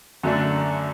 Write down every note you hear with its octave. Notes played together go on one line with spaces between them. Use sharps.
F#2 D3 A3 D4